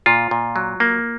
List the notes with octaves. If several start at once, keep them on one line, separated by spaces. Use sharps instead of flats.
A#2 F4
A#2
F#3
A#3